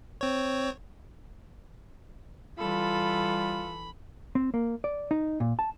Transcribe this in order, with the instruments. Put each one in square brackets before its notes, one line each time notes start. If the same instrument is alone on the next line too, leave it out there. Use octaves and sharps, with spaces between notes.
[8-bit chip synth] C4 C#5
[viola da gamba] E3 A4 [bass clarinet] G3 [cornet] F4 [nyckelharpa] B5
[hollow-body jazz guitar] C4
A#3
D5
D#4
A#2
A5